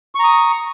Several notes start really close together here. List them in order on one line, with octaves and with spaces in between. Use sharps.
C#6 A#5 D#6